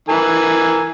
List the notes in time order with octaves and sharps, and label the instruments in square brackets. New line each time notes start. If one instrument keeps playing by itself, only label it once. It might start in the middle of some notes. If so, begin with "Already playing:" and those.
[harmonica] E3 A#4 G#5